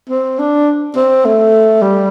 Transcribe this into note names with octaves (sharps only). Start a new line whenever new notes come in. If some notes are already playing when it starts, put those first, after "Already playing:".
C4
D4
C4
A3
G3